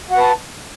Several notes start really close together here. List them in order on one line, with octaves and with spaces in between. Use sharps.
F#4 F#5 B4 A5